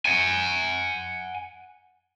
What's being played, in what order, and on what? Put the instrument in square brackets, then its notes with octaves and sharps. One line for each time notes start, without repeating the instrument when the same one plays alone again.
[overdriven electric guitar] F#5 G#5